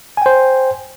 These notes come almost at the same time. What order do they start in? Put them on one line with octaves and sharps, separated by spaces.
G#5 G5 C5